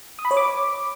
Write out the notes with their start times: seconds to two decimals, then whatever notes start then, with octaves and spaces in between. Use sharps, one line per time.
0.19 D#6
0.25 B5
0.31 C#5
0.37 D6